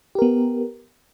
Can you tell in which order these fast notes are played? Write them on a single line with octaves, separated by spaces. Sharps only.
G4 A#4 B3